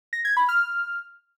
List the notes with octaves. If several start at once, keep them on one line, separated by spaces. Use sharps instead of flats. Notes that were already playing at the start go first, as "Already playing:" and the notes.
A#6
G#6
B5
F6